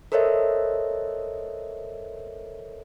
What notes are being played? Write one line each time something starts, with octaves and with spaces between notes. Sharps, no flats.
A4 A#4 C5 C#5 D#5 E5